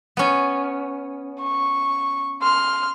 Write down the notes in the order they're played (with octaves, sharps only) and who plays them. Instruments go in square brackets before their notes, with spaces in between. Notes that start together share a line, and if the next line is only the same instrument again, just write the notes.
[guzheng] B3 C#4
[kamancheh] C#6
C6 F6